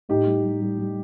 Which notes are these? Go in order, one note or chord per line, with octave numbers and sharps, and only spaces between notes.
A2 D#4 G4
G3
G3
G3
G3